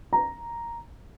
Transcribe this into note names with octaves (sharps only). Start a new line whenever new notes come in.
A#5